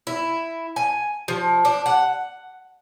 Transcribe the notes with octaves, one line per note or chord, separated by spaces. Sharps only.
E4
G#5
F3
D4
F#5